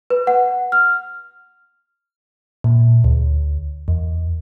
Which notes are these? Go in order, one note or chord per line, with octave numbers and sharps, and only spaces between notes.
B4
F#5
F6
A#2
D2
E2